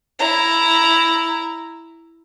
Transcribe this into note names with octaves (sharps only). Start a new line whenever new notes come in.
E4 A#5